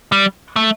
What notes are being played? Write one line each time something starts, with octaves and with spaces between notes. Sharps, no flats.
G3
A3